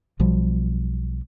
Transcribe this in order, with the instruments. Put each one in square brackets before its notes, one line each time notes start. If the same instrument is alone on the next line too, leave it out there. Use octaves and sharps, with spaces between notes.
[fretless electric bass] B1 B2 F3 G3